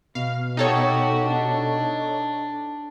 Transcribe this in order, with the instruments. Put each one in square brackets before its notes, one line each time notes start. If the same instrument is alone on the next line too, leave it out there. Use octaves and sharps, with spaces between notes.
[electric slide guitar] B2 [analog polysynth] F5
[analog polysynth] D#4 A4 C#5 [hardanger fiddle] F#4 G4
[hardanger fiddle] D4